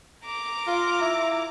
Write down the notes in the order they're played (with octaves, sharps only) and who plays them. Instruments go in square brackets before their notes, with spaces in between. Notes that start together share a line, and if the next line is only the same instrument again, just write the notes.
[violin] A#5 D6
[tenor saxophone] F4
E4